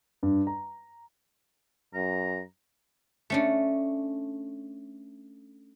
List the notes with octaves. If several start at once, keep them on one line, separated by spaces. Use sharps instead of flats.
G2
A#5
F#2 A#5
A3 C#4 D4